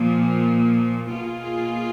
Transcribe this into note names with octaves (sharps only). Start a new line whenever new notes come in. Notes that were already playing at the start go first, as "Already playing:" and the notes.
Already playing: A#2 F3 A#3
B2 A#3 F4 G#4